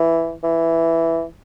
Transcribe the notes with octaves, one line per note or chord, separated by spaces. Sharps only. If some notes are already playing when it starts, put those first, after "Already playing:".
Already playing: E3
E3